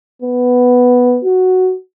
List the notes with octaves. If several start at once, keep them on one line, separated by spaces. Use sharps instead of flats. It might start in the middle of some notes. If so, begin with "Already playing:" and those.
B3
F#4